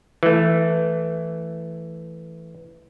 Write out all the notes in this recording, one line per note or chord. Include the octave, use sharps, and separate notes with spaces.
E3 A3